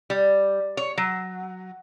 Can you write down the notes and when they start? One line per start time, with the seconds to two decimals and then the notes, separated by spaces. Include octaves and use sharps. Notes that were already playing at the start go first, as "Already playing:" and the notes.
0.10 G3
0.77 C#5
0.97 F#3